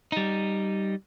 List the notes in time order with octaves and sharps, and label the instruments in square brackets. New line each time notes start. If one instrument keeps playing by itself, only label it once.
[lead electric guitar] G3 D#4